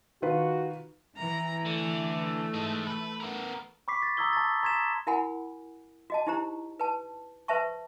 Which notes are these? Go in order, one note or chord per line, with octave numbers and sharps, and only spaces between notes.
D#3 F4 F#4 B4
E3 A#5
D3 A3
G#3 D#4
B4
B3 A#4
B5 C#6 D6 B6 C7
A6
A#5 C#6 D#6 E6 G#6 G7
A5 C#6 A6
A#5 C6 G#6 B6 E7
E4 F#4 A#4 F#5 G#5 B5
F#4 D#5 A5
D#4 E4 G4 C5 A#5
B4 A5
B4 C5 E5 A5 C#6